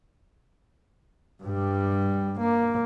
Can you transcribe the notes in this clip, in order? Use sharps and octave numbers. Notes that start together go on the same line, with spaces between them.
G2 G3
A#3